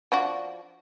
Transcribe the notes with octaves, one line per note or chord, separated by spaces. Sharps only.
F3 D4 F#4